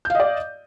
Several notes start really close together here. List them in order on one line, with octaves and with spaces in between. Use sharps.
G6 F5 D#5 D5